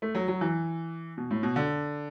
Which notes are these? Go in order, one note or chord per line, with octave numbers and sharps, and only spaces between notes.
A3
F#3
F#3
E3
B2
A2
B2
D3